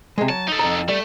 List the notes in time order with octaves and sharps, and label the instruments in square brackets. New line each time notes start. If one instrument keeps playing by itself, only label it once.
[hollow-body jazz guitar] C3 G#3
[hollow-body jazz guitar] F#3 [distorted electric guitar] A5
[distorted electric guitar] D#4 A4
[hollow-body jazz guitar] F2 A#5
[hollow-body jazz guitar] G3 [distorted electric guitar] A3